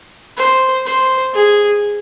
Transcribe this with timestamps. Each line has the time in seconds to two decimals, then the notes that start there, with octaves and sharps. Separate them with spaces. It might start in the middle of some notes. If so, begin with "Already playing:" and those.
0.37 C5
0.86 C5
1.33 G#4